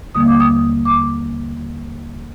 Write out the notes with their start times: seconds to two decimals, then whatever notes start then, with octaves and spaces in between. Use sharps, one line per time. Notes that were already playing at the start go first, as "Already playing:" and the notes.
0.15 D#2 D3 G3 A#3 D#6
0.28 D6
0.40 D#6
0.85 D6